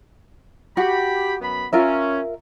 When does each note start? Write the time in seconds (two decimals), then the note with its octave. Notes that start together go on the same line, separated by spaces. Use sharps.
0.77 F#4 G4 B5
1.40 F#2 B3 B5
1.73 C#4 F4 A#4 E5